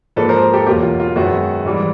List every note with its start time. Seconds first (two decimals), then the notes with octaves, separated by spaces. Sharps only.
0.16 G#2 F3 A#3 A4 B4
0.29 A#4 C5
0.54 G4 A4
0.66 E2 B2 F#3 A#3 F4 G4
0.83 F4
0.99 F4
1.16 F#2 D#3 G#3 B3 F#4
1.65 G#2 E3 G3